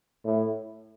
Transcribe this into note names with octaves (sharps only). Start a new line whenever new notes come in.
A2